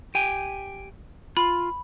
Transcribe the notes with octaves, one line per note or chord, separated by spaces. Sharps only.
G4 G5 G#5
F4 B5